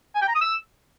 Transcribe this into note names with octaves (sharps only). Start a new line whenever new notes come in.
G#5
G5
A#5
D#6
E6